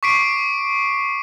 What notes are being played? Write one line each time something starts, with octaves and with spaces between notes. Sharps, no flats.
C#6 D6 B6 C7 D7